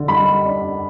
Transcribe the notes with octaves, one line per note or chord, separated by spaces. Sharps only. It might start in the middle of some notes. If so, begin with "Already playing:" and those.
Already playing: D3
G3 B5
D4